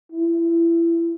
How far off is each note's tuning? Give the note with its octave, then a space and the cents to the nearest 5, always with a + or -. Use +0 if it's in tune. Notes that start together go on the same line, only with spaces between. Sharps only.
E4 +25